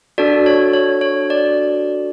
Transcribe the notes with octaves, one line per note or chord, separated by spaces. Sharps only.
D4 F#4 A4 D5
C#5
C#5
C#5
D5